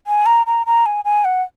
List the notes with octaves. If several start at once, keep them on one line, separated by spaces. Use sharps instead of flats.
G#5
A#5
A#5
A#5
G#5
G#5
F#5